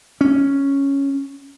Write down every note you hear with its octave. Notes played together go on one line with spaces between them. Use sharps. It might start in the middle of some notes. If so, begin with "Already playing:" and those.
C#4